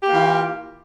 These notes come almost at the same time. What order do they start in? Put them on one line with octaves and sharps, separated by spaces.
G4 A#3 E3 F4